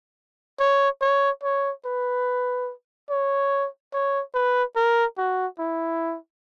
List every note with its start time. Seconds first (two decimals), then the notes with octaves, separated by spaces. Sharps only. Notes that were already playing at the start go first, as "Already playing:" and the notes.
0.60 C#5
1.01 C#5
1.43 C#5
1.85 B4
3.10 C#5
3.93 C#5
4.34 B4
4.76 A#4
5.18 F#4
5.59 E4